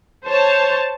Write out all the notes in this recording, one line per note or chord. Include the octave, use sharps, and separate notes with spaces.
C5 C#5 A5